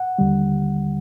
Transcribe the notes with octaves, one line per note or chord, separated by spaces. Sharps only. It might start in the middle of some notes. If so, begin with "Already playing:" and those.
Already playing: F#5
D#2 D3 G3